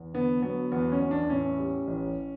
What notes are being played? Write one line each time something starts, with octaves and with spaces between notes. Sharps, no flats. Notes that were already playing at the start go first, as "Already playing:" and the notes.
Already playing: E2
D3 B3
F#3 B3
E2 B3
C#4
E2
D4
A2 C#4
G3
A1